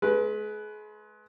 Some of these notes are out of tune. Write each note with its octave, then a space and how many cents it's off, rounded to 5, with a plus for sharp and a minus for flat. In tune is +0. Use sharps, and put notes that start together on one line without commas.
G#3 +35 B4 +0